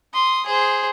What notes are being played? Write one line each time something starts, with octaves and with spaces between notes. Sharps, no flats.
C6 D#6
G#4 C5